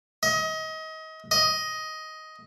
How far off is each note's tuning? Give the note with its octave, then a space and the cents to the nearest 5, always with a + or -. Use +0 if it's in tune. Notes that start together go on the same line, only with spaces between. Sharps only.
D#5 +30
D#5 +10